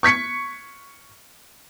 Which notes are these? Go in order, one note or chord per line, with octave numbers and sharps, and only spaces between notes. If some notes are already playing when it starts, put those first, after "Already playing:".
C#6 G#6 B6 C#7